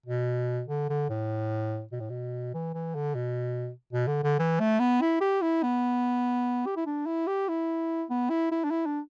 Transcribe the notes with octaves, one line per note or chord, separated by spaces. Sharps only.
B2
D3
D3
A2
B2
A2
B2
E3
E3
D3
B2
B2
D3
D3
E3
A3
B3
E4
G4
E4
B3
G4
E4
D4
E4
G4
E4
B3
E4
E4
D4
E4
D4